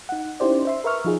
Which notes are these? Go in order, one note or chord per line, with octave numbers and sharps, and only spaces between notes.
D#4 F#5
C#4 D#4 E4 G4 C5 D5
C5 E5 C6
A#4 B4 E5 C#6 F6
F3 D#4 F4 G#4